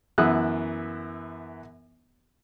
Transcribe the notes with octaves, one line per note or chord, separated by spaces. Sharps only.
F#2 E3 B3 D#6 E6 F#6